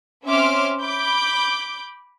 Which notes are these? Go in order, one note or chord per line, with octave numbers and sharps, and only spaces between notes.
C4 C#4 E5 C6 D6 F6
B5 D6 G6